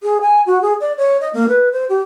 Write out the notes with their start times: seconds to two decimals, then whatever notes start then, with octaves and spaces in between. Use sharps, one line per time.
0.03 G#4
0.21 G#5
0.47 F#4
0.62 G#4
0.80 D5
0.98 C#5
1.21 D#5
1.33 A#3
1.49 B4
1.72 C5
1.89 G4